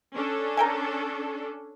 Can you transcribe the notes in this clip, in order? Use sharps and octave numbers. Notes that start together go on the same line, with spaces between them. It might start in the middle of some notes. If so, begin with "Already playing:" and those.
C#4 D4 A4
A#4 G5 G#5